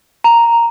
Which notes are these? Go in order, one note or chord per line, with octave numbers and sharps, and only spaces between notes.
A#5